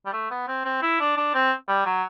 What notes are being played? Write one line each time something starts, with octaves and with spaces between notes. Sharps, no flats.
G3
A3
B3
C4
C4
E4
D4
D4
C4
G3
F#3